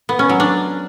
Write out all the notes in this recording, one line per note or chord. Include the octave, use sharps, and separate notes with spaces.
B3
C#4
F#3
D4